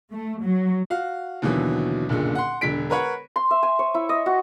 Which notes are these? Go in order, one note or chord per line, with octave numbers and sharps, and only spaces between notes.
A3
F#3
F#4 F5
D#2 B2 D3 E3 F#3
F#1 B1 A#2 D3
F#5 C6
E1 D3 B6 D7
A#4 B4 C#5 F#5
C6
E5
G#5
C#5
E4
D#5
F#4